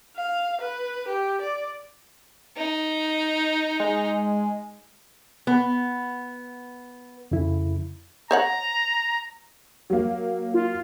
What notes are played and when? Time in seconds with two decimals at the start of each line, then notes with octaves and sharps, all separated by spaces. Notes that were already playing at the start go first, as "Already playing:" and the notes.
0.16 F5
0.61 B4
1.08 G4
1.41 D5
2.57 D#4
3.80 G#3
5.47 B3
7.31 F2 C#3 E4
8.31 C5 C#5 F#5 A#5
9.90 F#3 A#3
10.54 F4